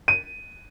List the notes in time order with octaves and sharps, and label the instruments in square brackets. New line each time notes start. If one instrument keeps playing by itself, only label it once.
[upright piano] D#7